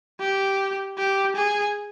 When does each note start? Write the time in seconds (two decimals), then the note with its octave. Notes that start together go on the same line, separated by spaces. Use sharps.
0.20 G4
0.98 G4
1.36 G#4